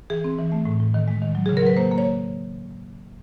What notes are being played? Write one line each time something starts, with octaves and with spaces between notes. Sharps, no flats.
E3 G#4
C4
E3
A3
A2
A2
D#3
G#3
D#3
F#3
C#3 G#4
A#4
F#3 B4
A#3 C5
A#3
C#5